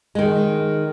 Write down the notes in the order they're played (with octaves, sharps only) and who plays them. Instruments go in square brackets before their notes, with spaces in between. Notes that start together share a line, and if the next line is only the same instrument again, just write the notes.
[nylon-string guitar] D#3 G#3